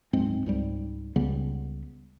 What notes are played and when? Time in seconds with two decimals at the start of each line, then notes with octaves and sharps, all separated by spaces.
0.13 D1 G#2 G#3 C4
0.46 C#2 G#2 G3
1.16 C#2 C#3 G3 B3